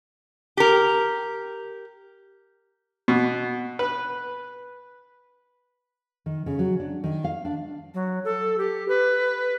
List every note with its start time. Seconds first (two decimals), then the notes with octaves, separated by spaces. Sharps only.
0.57 G4 A#4
3.08 B2
3.79 B4
6.26 D#3
6.46 C#3
6.59 F#3
6.79 D4
7.04 D#3
7.24 F5
7.45 D4
7.94 F#3
8.25 A4
8.58 G4
8.88 B4